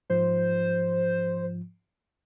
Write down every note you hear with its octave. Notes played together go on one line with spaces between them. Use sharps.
G#2 F3 C5